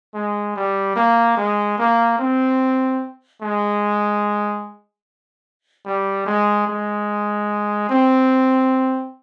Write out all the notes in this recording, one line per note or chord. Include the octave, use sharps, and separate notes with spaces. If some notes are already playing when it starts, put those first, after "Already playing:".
G#3
G3
A#3
G#3
A#3
C4
G#3
G3
G#3
G#3
C4